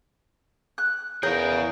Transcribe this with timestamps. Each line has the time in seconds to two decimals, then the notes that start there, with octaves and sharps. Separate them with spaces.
0.78 F#6
1.23 E2 G#4 A#4 C#5 F5